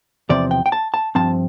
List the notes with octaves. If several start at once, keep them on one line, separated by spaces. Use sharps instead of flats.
E2 C3 F3 C4 D5
G5
G5
A5
A5
G2 F3 C4 A5